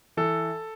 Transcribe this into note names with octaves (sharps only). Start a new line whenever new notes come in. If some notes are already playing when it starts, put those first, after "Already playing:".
E3 A4